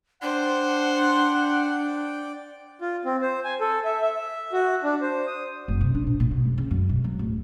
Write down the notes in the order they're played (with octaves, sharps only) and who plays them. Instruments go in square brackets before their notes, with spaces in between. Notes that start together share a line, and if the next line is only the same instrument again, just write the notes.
[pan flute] D4 [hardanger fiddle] C5 [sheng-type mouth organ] D5 G5 [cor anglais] F#5
[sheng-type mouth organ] F4
C4
C5
G#5
A4
E5
E5
F#4
D4
C5
D#6
[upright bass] F#1
C3
D4
A#2
A#2
B2
F#1
C#3
F#2
B2
F#3
D1